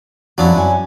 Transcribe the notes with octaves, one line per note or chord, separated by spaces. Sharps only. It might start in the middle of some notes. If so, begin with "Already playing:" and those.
F2 F#3 C#4 D4 E4
F#2 C#4 G#5